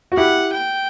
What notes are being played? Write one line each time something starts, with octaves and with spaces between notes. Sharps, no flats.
F#4
E4 G4 F#5
G5